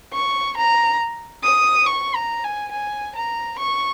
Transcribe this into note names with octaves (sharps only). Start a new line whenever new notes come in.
C#6
A#5
D#6
C#6
A#5
G#5
G#5
A#5
C#6